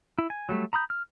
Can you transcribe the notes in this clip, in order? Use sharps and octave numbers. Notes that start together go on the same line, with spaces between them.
E4
G#5
F#3 G3 A3
A#5 B5 D#6 G6
F6